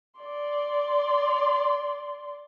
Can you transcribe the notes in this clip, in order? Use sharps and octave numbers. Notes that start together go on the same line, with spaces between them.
D5 C6